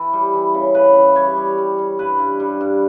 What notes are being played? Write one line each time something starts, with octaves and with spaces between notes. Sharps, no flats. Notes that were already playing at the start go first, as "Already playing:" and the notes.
Already playing: E3
G3
E3
C#3
C#3 B4
E3
G3 C#5
G3
G3
G3
G2 B4
G2
G3
G2